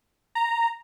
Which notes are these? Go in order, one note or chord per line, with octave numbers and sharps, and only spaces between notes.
A#5